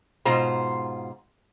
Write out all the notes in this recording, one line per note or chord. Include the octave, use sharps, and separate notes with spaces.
G#2 B2 F4 C5 A#5